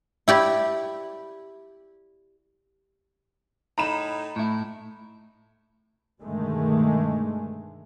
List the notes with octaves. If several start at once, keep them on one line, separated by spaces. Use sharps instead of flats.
E4 G4 D5
A2 D#4 A#5 B5 E7
A2 E4
G2 B2 D3 D#3 G#3 A3